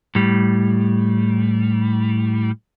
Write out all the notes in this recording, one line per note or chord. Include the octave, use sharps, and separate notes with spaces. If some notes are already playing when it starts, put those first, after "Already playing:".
A2 G3